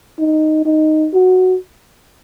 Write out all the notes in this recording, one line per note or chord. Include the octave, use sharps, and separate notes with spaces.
D#4
D#4
F#4